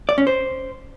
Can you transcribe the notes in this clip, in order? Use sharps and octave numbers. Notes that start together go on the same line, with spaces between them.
D5
C#4
C5